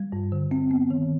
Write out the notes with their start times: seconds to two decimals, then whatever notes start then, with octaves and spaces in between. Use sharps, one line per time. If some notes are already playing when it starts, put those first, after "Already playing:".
Already playing: G3
0.12 G2
0.32 D3
0.51 C4
0.71 B3
0.90 D#3